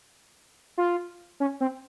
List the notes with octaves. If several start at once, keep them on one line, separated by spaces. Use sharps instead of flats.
F4
C#4
C4